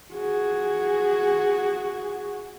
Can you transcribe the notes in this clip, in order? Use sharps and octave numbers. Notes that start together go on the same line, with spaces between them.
F#4 G#4